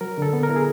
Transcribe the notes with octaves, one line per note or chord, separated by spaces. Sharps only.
F#3 A#4
D3 A4
B3
A#4
E4
G#4